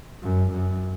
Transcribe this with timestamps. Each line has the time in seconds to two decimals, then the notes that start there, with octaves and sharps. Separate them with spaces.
0.23 F#2
0.52 F#2